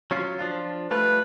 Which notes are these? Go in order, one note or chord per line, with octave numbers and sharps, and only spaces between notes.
F#3 C#4 F4
F3 D4 F4
G3 A3 F4 B4